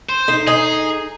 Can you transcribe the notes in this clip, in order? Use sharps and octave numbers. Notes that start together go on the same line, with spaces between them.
C5
D#4 A4 C7
D#4 G#4